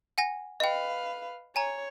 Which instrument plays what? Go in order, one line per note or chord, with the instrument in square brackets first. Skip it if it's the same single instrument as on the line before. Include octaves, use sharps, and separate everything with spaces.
[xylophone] F#5 G#5 A#6
[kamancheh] B4 F5 [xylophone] D#5 G5
[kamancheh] C#5 [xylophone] G#5 A#5